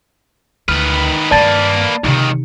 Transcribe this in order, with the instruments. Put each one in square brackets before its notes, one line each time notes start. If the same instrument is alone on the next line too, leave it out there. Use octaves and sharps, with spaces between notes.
[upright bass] D2 [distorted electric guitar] D#3 B4 [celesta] F6
[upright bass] G2 D#3 [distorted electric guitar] A#3 B4 [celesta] D5 A5 A6
[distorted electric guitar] C#2 D#3 [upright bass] C3 D#4